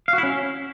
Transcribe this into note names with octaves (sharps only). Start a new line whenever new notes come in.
F5
F#4
E4
C#4